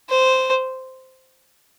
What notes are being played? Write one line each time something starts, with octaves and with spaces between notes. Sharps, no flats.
C5